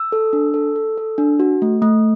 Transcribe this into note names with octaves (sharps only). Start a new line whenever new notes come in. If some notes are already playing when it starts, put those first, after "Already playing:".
Already playing: E6
A4
D4
A4
A4
A4
D4
F#4
A3
A3